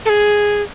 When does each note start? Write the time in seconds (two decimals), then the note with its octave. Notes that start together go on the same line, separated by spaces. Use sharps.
0.05 A4
0.09 G#4